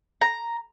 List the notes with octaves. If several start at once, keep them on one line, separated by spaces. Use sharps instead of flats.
A#5